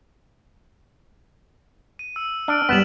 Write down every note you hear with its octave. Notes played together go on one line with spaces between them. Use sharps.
D#7
E6
D4 E6 F6 D7
F#2 G3 B3 B6 E7 F#7